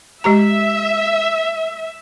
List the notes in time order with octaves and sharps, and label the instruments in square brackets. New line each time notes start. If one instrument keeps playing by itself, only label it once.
[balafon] G#3 G4 A#5 [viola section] E5